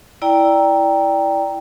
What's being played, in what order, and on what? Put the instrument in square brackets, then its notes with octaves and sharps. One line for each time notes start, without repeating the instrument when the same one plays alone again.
[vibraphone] E4 D5 G5 A#5